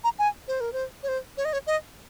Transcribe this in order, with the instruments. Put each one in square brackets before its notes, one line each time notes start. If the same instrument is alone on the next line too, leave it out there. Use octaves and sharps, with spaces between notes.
[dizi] A#5
G#5
C5
A#4
C5
C#5
C5
C#5
D#5
C#5
D#5